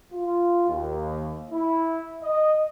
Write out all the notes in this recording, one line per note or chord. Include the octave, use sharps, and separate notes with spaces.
F4
D#2
E4
D#5